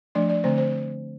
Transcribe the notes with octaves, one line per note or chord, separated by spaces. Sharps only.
F3 A3 D4 D5
D5
D3 A3 C4 C5
C5